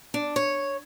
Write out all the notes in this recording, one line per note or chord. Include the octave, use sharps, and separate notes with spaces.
D4
C#5